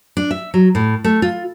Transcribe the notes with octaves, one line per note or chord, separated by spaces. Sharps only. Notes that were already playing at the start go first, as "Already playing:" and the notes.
D4
E5
F#3
A2
A3
F4